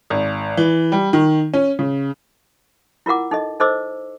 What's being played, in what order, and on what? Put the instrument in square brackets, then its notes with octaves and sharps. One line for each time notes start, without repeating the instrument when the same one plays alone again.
[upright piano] G#1
E3
G3
D#3
C#4
C#3
[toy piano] E4 F4 A#4 F#5 D6
D#4 A4 D#5
D#4 A4 C5 D#5 D6 E6